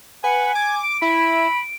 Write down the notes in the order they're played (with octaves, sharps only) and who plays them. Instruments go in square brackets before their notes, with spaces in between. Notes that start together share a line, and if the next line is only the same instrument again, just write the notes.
[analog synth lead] B4 [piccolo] F#5 [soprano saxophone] G#5
[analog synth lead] D6 [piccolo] G#6
[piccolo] D7
[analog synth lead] E4 [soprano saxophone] B5